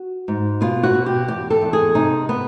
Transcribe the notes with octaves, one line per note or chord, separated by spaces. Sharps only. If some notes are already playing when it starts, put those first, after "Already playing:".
Already playing: F#4
G#2
B2 F4
F#4
B2
G4
E2 G4
A4
E2
G#4
C3 D#4
B3